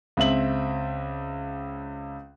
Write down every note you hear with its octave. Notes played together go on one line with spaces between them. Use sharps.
C#2 C4 E5 F#7